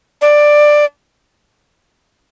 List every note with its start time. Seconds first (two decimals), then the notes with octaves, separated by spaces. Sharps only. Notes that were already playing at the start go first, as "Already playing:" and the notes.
0.22 D5